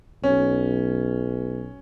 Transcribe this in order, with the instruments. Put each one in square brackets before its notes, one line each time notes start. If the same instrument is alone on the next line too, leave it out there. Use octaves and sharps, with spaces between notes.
[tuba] B1 [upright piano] C#4